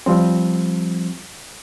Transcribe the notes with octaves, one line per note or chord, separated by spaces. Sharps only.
F3 G3 C4